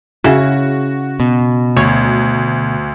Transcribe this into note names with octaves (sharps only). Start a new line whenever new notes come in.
C#3 E4 F#4
B2
D2 C#5